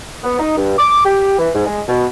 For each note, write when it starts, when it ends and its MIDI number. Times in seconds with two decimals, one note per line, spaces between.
0.24 0.36 59
0.39 0.54 63
0.57 0.77 43
0.78 1.03 86
1.05 1.35 67
1.38 1.49 52
1.54 1.65 44
1.66 1.81 56
1.88 2.05 47